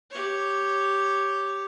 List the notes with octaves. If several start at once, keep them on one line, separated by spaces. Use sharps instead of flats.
G4 C#5